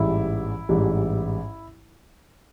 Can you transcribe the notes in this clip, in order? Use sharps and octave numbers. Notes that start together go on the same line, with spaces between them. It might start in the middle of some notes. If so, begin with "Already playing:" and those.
Already playing: A1 G#2 E3 G3 E4
A1 G#2 E3 G3